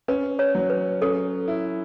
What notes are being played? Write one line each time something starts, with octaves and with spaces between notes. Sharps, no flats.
C#4 B4
C#5
F#3
B4
C#4 A4
E4